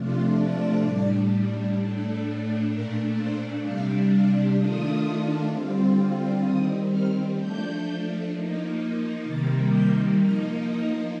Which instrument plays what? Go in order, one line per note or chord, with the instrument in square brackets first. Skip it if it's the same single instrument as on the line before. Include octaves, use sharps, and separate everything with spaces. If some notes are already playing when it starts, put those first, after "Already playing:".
Already playing: [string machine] C3 F3 A3 D4 F4
D5
A2 G3 D4
A2 A3 D4
A#2 A3 D4 A#4
C5
C3 G3 D4 F5
F5
D#3 A3 D4 F4 D#6
D3 G3 C4 F4
D#3 G3 C4 D#6
F6
F3 A3 D4 G6
F3 A#3 D#4
C3 D#3 G3 A#3 A6
G6
F3 A#3 D#4 F6
D#6